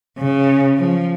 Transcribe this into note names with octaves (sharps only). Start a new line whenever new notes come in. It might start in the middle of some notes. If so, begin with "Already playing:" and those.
C#3
F3